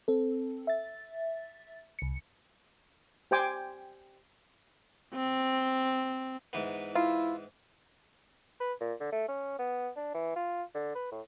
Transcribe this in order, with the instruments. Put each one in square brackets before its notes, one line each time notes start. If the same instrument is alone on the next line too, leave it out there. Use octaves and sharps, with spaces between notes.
[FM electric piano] C4 A4
E5 A6
C2 C#7
[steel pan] G4 C5 G5 G#5 D6
[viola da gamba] C4
[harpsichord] G#2 E3 B3
[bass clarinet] E4 [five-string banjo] F4
[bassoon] B4
A#2
D3
A3
C#4
B3
D4
E3
F4
D3
B4
A2